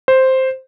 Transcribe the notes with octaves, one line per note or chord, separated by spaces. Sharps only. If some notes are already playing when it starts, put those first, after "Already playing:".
C5